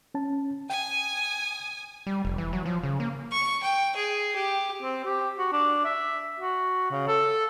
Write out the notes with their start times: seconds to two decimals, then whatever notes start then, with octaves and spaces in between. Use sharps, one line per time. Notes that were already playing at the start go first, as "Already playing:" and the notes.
0.14 C#4 A5
0.70 G5 G#5 D#6
2.07 G3
2.25 F1
2.38 E3
2.53 F#3
2.66 F3
2.83 C#3
3.00 A#3
3.31 C#6
3.63 G5
3.96 G#4
4.35 G4
4.82 C4
5.04 G4
5.38 F#4
5.52 D4
5.85 E5
6.40 F#4
6.91 C#3
7.08 A4